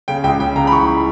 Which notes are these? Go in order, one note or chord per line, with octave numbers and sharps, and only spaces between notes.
C#3 G5
C#2 G5
C#3 G5
C#3 A#5
B5
E3 C#6
E3